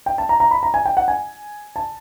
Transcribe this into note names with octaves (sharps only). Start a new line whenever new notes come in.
G5
A5
A#5
A#5
B5
A#5
G#5
G5
F#5
G#5
A5